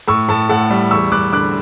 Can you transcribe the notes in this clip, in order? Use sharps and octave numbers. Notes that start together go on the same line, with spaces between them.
A2 C#6 E6
A2 A5 C#6
A2 F#5 A5
G3
E2 C#6 E6
G3 D6 F#6
D3 D6 F#6